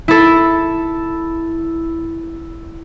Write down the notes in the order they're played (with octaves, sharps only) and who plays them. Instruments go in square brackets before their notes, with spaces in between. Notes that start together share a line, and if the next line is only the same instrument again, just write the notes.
[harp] E4 A4